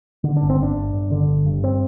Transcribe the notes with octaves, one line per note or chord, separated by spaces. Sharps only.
D3
G1 D4
C4
G2
D4
G1
G1
D3
G1
G2
C4